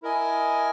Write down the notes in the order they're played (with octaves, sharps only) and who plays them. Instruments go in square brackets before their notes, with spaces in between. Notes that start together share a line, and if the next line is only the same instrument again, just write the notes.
[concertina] E4 A#4 D#5 G#5